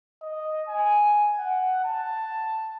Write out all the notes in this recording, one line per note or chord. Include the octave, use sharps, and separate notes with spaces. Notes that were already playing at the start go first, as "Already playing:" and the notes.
D#5
G#5
F#5
A5